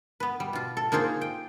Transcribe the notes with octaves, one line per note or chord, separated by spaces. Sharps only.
B3 B4
G3
B2 F4
A4
A#3 D#4 F4 G#4 C5
G5